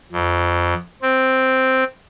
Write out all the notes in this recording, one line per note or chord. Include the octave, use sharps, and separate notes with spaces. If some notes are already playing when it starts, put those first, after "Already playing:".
F2
C4